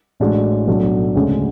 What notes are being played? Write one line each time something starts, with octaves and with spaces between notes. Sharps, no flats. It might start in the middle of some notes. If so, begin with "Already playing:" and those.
A1 A2 G#3 D4 F#4
B1 A2 F#3 A3 D4
D2 C#3 G#3 C#4